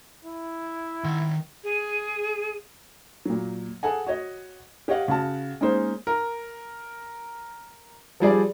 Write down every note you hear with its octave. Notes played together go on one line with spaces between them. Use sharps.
E4
D#3 C6
G#4
A#2 F#3
G#4 A4 F#5 G#5
F#4 C#5 D#5
G4 C#5 D#5 F5 F#5
C#3 F#4 A5
G#3 A#3 C#4 D#4 G#4 C5
A#4
F3 G3 G#4 D5